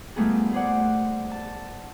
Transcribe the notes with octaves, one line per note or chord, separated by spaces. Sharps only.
A#2 D#3 G3 A3 B3 G#4
G#4 C5 D5 F#5
A5